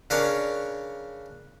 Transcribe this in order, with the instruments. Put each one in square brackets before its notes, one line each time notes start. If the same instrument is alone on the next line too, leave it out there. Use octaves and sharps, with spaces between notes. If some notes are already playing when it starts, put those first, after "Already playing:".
[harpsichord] C#3 D4 A#4 C#5